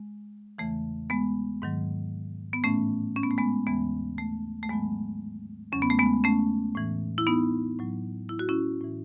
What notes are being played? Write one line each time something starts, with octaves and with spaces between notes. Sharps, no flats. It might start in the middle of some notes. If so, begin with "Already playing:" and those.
Already playing: G#3
E2 C#3 E3 A3
G#3 B3
G#2 D#3 F#3
B3
A2 E3 A3 C#4
C#4
B3
A3
G#3 B3
D#2 C#3 E3 G#3 B3
A3
A3
G#2 D#3 F#3 G#3 B3
E2 C#3 F#3 C#4
B3
A3
G#3 B3
A3 C#4
A2 E3
E4
B3 D#4
A2 F#3
E4
F#4
C#4 E4
A2 E3